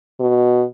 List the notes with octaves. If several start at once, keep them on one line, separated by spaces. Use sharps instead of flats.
B2